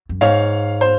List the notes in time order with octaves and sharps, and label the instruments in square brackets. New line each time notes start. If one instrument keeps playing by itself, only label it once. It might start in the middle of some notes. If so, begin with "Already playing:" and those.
[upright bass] F#2
[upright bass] G#2 [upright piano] C#5 F5
[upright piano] C5